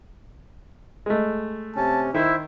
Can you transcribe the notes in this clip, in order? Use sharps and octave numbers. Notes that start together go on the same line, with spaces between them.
G#3 A3
C3 C#4 A5
D#3 E4 C5 E5